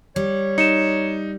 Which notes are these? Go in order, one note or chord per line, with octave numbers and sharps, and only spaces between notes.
G3 C#5
D#4 C#7 E7